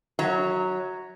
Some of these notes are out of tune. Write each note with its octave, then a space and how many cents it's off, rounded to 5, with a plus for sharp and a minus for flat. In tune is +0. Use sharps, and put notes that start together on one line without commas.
F#3 +0 E5 -40 A#5 -10